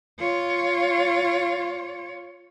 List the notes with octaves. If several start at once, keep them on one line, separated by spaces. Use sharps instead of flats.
F4 C#5